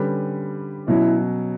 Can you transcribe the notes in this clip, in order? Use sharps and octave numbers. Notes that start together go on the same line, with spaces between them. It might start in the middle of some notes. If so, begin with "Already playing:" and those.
Already playing: D3 G3 C#4 G4 B4
B2 F#3 C#4 E4